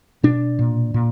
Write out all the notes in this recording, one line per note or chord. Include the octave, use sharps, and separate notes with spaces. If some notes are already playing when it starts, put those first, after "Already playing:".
B2 D4
A#2
A#2